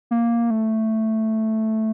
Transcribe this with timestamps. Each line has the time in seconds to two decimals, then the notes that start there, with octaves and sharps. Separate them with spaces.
0.11 A#3
0.50 A3